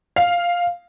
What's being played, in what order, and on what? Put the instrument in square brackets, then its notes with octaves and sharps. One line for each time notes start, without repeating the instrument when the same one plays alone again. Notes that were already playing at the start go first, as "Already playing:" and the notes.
[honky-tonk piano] F5